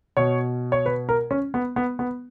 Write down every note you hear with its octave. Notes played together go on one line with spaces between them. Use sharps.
B2 C#5
C#5
B4
A#4
C#4
B3
B3
B3